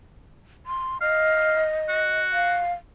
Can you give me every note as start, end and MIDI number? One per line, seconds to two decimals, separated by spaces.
0.66 0.98 84
1.01 2.21 75
1.01 1.66 77
1.89 2.60 66
2.33 2.72 77